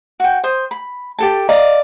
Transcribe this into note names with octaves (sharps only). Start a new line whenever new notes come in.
F#4 G5
C5 D#6
B5
G4 A4 A5
D5 D#5 F5 A#5